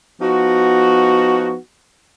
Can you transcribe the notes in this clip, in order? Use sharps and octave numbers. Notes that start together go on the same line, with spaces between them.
F3 B3 D#4 F#4